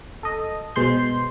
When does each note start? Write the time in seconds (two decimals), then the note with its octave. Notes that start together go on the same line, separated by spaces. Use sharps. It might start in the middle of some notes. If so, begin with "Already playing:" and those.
0.23 A4 D#5
0.76 B2 G#3 C5 C6 G6